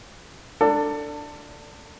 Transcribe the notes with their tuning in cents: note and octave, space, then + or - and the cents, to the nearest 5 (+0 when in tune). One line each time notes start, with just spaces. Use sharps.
D4 +0 A4 +25